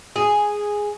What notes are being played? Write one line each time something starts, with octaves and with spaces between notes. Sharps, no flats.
G#4